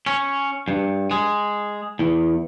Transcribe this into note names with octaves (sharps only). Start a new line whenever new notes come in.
C#4
G2
G#3
E2